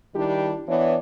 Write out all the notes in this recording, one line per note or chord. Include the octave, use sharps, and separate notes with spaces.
D#3 G3 D4 E4 G4
E3 B3 D4 C#5 D5